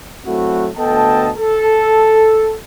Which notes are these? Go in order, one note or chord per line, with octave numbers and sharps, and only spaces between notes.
F#3 A3 C4 E4 F#4
D2 B3 A4 D#5 G5 A5
A4